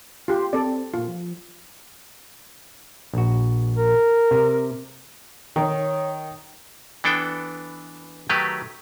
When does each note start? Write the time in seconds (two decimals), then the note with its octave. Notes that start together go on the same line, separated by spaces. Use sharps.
0.28 F4 G4 C6
0.53 C4 A4 D5
0.94 A#2 F4
1.08 F3
3.14 A#1 F#4
3.75 A#4
4.31 C3
5.56 D#3 C#5
7.04 E3 B3 D4 A4 G5
8.29 D#3 F#3 A3 G4 B4